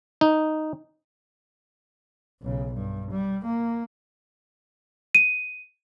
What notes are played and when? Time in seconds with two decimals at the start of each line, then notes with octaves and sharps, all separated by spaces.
0.21 D#4
2.42 B1 C#3
2.74 G2
3.11 G3
3.44 A#3
5.15 D#7